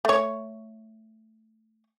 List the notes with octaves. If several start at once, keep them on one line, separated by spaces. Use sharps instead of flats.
A3 C#5